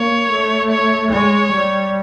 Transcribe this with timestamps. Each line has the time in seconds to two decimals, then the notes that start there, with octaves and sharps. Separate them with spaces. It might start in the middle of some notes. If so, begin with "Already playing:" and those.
Already playing: A#3 C#5
0.30 A3
0.71 C#5
1.11 G#3 C#5
1.52 G3